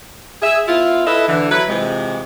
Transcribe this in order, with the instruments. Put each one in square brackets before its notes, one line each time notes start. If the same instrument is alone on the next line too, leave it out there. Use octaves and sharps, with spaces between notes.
[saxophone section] G#4 E5
B3 E4 F4
E4 A4 B4 D#5 E5
D3 E3
F#3 E4 B4
C3 E3 F3 G#3